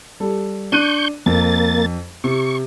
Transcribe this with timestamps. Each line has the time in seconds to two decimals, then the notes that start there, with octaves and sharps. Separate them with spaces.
0.20 G3 A4
0.72 D4 C#6 F#6 G6 D#7
1.26 F2 A#3 A6
2.24 C3 C#6